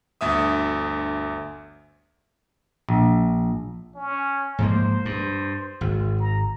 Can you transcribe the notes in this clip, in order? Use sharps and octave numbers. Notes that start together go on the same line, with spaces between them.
G1 D2 E5 D#6
A#1
C#4
G#2 F3 A#3 C5
G2
G#1
A#5